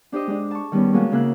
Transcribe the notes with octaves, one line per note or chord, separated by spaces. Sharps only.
D4 G4 C5 D#5
G#3 D4
A5 C#6
D#3 G3 B3 C#4
G#3 A#3 C#4 F4 F#4
C#3 A#3 E5 F#6